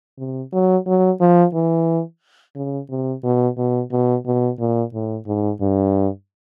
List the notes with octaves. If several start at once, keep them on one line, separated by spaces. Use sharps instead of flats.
C3
F#3
F#3
F3
E3
C#3
C3
B2
B2
B2
B2
A#2
A2
G#2
G2